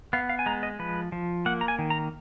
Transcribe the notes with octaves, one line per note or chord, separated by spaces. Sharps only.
B3 F5
F5
G#5
G#3 A#5
D#5
F3 B4
F3
A#3 F#5
A#5
G#5
D#3
A#5